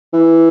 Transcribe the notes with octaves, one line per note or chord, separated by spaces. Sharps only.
E3